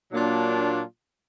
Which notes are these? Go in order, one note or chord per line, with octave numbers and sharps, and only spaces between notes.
A#2 F#3 A#3 D4 F4